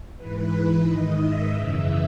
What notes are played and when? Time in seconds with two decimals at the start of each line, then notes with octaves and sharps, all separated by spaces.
0.16 G#2 E3 B4
0.84 G#2 D#3 D#5
1.17 E5
1.51 F#2 C#3 E3 E5